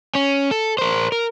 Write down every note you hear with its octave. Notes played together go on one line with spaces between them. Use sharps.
C#4
A4
A#4 C5
A#4